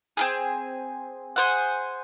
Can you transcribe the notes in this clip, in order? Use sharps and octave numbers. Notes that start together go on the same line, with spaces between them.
C4 F4 G#4
G#4 C5 F#5